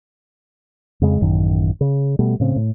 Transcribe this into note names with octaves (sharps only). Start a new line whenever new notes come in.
F2 C#3 G#3
A1 F#2 D#3
C#3
B2 G3 A3
A2 C#3 C4
A2